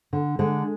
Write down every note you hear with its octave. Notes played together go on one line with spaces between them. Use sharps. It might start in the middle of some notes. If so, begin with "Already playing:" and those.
D3
D3 G#3